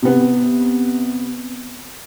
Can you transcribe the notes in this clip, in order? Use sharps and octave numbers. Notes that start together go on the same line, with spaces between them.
C3 B3